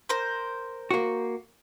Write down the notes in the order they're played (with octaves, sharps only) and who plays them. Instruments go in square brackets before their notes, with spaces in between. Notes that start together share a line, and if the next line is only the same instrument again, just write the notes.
[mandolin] A#4 C5
[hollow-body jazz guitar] A#3 F#4